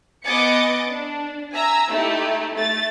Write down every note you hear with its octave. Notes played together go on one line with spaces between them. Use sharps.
B3 D#5 G#5 D6 A6 C#7
D4
E5 G#5 A#5 E6
A3 D#4 E4 G4 A4
A3 A6